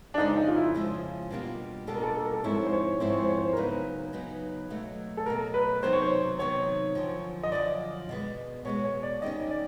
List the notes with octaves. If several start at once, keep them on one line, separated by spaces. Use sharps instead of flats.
D4
F2 C#3 F3 G#3 C#4 D#4
D#4
F4
E4
F2 C#3 F3 G#3 C#4
B2 G3 A#3 D4 F4
B2 G3 A#3 D4 F4 A4
A#4
A4
A#4
A4
A#4
A4
G#2 F3 G#3 C4 E4 C#5
C5
C#5
G#2 F3 G#3 C4 E4 C5
C#5
C5
C#5
C5
A#4
C#3 F#3 B3 D#4 B4
C#3 F#3 B3 D#4
B2 F#3 A3
A4
B2 F#3 A3 A#4
B4
C3 D#3 F#3 B3 D#4 C5
C#5
C5
C3 D#3 F#3 B3 D#4 C#5
F#2 D3 F3
D#5
F#2 D3 F3 D5
B2 G#3 B3
B2 G#3 B3 C#5
C#5
D5
D#3 G3 A#3 C#4 D#5
D5